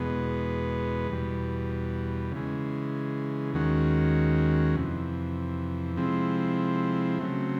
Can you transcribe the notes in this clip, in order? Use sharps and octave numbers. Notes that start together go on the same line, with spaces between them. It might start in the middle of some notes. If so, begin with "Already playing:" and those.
Already playing: E2 B2 G#3 B3
E2 B2 G3
C#3 E3 G#3
D#2 D#3 G#3 C#4 F#4
F2 C3 E3
C3 F3 G#3 C4 E4
C#3 F#3 A3 C4